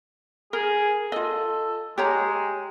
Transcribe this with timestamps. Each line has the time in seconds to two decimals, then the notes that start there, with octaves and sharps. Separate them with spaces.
0.53 G#4 A#4
1.12 F4 A4 D#5
1.98 G#3 G4 C#5 A#5